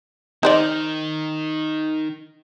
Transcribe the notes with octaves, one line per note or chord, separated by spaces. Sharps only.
D#3 D#4 C5 D5